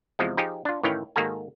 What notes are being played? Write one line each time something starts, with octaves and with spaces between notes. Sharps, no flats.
E2 C3 F3 G#3
F3 D#4 G4 G#4
D4 F4
A2 D#3 E3 C#4 F5 G5
G#2 D#3 A#3 F#4 A4 G#5